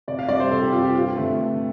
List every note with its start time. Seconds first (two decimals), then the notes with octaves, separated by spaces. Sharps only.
0.08 C3 D5
0.19 F5
0.29 G3 C4 D5
0.40 C5
0.51 C3 A4
0.62 G4
0.72 G3 C4 F4
0.83 G4
0.94 G2 F4
1.16 D3 A3 C4
1.38 G2